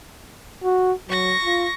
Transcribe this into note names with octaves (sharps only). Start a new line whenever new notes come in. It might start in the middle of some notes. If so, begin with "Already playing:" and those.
F#4
F#3 C#6 A#6
F4